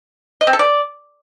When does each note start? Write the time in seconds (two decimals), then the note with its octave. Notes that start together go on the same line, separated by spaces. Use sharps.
0.41 D#5
0.47 C4
0.53 A4
0.59 D5